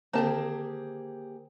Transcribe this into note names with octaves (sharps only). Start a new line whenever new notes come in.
D3 D#3 A#3 C4 G4 G#4 A5